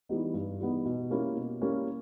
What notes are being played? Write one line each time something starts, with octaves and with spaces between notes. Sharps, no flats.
E3 G3 B3 D#4
G2
E3 G3 B3 D#4
B2
G3 A#3 C#4 E4
B2
G3 A#3 C#4 E4